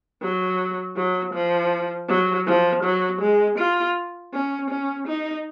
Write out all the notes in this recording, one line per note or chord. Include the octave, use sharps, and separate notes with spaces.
F#3
F#3
F3
F#3
F3
F#3
G#3
F4
C#4
C#4
D#4